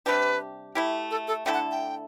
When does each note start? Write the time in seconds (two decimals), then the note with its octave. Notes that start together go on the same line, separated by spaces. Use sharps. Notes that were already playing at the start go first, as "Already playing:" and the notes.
0.06 C3 G3 D4 G4 B4
0.75 A3 E4 G4
1.11 A4
1.28 A4
1.45 D3 A3 E4 A4 G5
1.54 F#5
1.71 G5